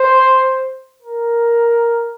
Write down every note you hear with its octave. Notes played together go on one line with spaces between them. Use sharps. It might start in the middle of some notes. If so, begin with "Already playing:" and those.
Already playing: C5
A#4